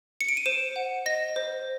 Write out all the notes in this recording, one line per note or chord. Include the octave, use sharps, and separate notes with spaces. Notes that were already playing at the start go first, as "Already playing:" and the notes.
C#7
D7
D#7
C5 E7
F#5
D#5 A#6
C5